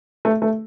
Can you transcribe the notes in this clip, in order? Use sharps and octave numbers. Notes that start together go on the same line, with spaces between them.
A3
A3